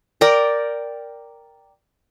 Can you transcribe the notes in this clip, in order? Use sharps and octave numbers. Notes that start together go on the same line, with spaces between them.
A#4 D5 G5 A#5